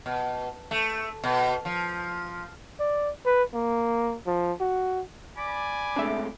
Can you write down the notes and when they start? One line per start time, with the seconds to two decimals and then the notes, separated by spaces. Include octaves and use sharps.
0.06 B2
0.71 A3
1.24 B2
1.65 F3
2.79 D5
3.26 B4
3.54 A#3
4.27 F3
4.60 F#4
5.37 D5 G#5 B5 D6
5.96 C3 G#3 A3 D4 E5